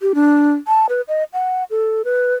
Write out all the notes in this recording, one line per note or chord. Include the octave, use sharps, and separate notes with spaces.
G4
D4
A5
B4
D#5
F#5
A4
B4